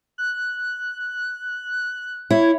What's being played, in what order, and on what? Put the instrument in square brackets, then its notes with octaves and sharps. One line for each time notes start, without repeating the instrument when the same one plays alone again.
[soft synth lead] F#6
[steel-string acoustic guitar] E4 [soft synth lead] C#5